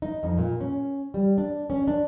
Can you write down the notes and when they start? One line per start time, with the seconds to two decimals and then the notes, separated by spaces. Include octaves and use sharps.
0.02 D#4
0.23 F2
0.38 A#2
0.61 C#4
1.14 G3
1.38 D4
1.70 C#4
1.88 D4